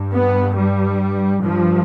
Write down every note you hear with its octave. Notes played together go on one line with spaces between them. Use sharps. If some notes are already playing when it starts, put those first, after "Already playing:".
Already playing: G2
B3
G3
G2 F3